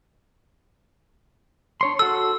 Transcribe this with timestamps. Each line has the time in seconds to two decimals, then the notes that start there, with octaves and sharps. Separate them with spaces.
1.81 D4 C#5 C6
1.99 F#4 A4 E6